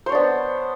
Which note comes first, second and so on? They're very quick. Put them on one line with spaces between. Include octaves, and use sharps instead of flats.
C5 C#5 D4 B3